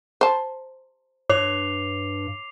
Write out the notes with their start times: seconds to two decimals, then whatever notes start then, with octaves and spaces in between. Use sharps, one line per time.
0.21 C5 A5
1.30 G2 C#5 D6 C7 F7